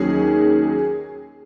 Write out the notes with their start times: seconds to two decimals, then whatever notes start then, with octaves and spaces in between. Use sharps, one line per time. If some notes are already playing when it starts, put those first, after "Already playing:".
Already playing: D#2 D#3 F#3 C#4 G#4